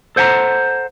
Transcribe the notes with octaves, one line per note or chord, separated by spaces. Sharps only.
A4 C5 F#5 G5 A#5